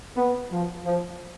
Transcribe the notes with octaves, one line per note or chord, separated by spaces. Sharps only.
B3
F3
F3